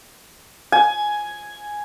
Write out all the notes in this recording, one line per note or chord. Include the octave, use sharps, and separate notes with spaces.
G#5